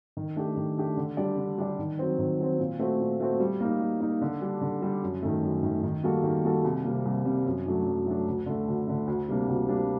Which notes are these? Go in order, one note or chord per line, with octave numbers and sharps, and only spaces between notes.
D#3
A3 D4 G4
D#3
A3 D4 G4
D3
G3 D4 G4 D5
D3
G3 D4 G4 D5
D#3
F#3 C4
D#3
F#3 C4
A#2
A3 C4 F#4
A#2
A3 C4 F#4
G3
A#3 D#4
G3
A#3 D#4
D3
G3 D4
D3
G3 D4
F#2
D#3 A3
F#2
D#3 A3
D#3
G3 A#3 F#4 A4
D#3
G3 A#3 F#4 A4
C2
C3 G3 A#3
C2
C3 G3 A#3
F#2
F#3 A3 D4
F#2
F#3 A3 D4
D2
D3 A3
D2
D3 A3
D2
C3 G3 A#3 D4
D2
C3 G3 A#3 D4